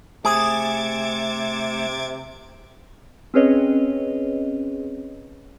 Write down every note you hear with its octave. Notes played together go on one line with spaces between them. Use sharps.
C3 A3 G#4 D6 G#6 A6
C4 C#4 G#4 B4 C#5 D#5